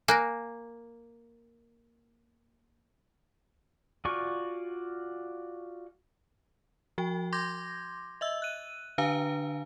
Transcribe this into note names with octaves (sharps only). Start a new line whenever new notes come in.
A#3 G#5 F#6 A#6
F4 F#4 D5 G#5 C#6
F3 F#4 G5
C6 D6 G6 G#6 A#6
D#5 E5 E6
F#6 D#7
D3 D4 B4 F5 G#5 A#5